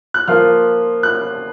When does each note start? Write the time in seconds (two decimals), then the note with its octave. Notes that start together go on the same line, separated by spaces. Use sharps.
0.14 F#6
0.28 F3 A#3 F4 F6
1.03 F#6